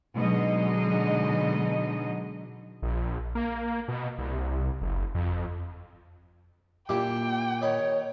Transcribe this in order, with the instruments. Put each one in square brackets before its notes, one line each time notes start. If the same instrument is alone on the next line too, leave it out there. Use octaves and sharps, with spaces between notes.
[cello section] B2 D3 F#3 G#3 D#4 D#5
[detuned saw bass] A#1
A#3
B2
C2
F#1
F2
[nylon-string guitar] A#2 G4 [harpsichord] A#3 D4 E4 [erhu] G5
[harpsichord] D#3 D#4 B5 [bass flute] C#5